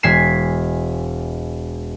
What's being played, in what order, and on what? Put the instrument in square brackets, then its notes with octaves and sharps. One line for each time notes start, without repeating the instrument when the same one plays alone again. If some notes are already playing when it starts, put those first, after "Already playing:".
[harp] E1 G#5 B6 C7 E7